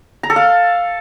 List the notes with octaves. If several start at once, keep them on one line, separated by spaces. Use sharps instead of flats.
A#5
A4
F5